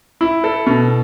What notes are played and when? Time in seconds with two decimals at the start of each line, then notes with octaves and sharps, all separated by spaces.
0.21 E4
0.44 A4
0.67 B2